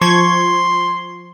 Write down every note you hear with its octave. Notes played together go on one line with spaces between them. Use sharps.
F3 C6 C#6 G#6